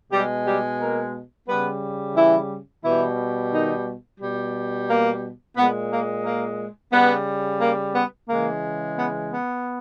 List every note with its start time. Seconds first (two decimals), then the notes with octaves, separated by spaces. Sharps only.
0.12 B2 G3 G#3 G4
0.46 G3 G4
0.80 A#3 A#4
1.48 C#3 G3 B3 B4
2.16 E3 E4
2.85 B2 E3 G3 E4
3.52 D#3 D#4
4.21 B2 G3
4.88 A#3
5.57 A#2 G#3 B3
5.91 A#3
6.25 A#3
6.93 C#3 G3 B3
7.61 A#3
7.95 B3
8.29 C#3 E3 G#3 A#3
8.97 B3
9.31 B3